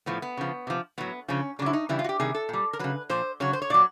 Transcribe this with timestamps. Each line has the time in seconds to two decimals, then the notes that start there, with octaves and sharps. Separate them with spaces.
0.06 A2 F3 B3
0.22 B3
0.37 C#3 F3
0.67 C3 F3
0.98 A2 F#3 B3
1.28 C#3 F3 C#4
1.59 C#3 D4
1.62 F#3 E4
1.73 D#4
1.89 C#3 E3 G3 E4
1.99 F4
2.04 F#4
2.09 G4
2.20 C3 D#3 G3 G#4
2.35 A4
2.49 A#2 G3
2.73 A#4
2.79 C#3 F#3 B4
3.09 A#2 F3 C5
3.40 C#3 F#3 C#5
3.53 C5
3.62 C#5
3.70 A#2 F#3 D5